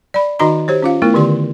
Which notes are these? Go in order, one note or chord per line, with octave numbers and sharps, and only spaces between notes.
D5 B5
D#3 D#4 F#4 D#5 A#5 C6
G4 C5 C#5
C#4 F4 F5
A3 B3 E4 A#4
D3 D#3 G4 D5 C6